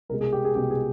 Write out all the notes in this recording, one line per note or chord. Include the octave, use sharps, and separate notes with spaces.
C2 B2 G#3 A#4
G#4
G4
G#4
C2 B2 G#3 G4
G#4